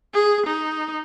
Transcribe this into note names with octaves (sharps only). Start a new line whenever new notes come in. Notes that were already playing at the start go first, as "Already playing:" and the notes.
G#4
D#4